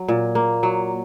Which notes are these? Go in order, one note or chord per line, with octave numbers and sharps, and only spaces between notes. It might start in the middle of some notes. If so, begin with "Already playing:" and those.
Already playing: F#3
A#2
A#3
F#3